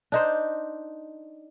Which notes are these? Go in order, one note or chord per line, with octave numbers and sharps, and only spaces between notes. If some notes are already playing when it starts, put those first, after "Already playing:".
D4 D#4 C5